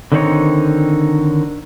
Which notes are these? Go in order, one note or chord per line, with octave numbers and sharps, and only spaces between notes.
D3 D#3 C4 D4 D#4 C#5